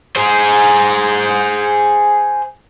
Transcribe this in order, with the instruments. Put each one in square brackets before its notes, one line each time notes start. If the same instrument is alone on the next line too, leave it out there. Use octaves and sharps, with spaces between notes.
[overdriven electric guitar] G#4 C5